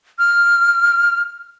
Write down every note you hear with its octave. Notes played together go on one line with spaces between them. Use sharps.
F6